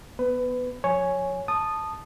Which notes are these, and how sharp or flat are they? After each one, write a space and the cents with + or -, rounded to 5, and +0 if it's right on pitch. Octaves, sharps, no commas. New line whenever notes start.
B3 -5 B4 +20
F3 +40 C#5 +0 G#5 +0
A5 +0 D#6 -15